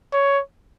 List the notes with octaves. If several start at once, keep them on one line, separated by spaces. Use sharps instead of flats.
C#5